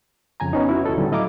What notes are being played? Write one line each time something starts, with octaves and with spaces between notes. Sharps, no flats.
F2 C#3 G#5 A#5
B3 C#4 D#4
E4 F#4
D2 E4 A4
A2 D3 F#3 G3
A3 E4 D#5 F5 A#5 D6